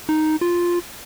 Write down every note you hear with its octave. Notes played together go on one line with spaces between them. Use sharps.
D#4
F4